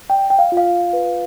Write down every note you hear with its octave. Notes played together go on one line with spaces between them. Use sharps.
D5 G5
G5
F5
F4
F5
B4